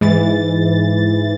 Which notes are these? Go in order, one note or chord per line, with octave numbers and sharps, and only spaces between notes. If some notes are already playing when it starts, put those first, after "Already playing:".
G#2 E3 A6